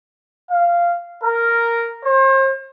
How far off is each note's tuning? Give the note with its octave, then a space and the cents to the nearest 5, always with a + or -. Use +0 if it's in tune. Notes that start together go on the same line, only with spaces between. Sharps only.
F5 -10
A#4 -5
C5 +40